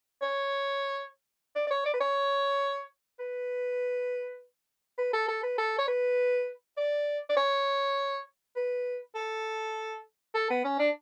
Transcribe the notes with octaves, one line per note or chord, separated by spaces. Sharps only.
C#5
D5
D5
C#5
D5
B4
C#5
B4
B4
A4
A4
B4
A4
C#5
B4
D5
D5
C#5
B4
A4
A4
B3
C#4
D4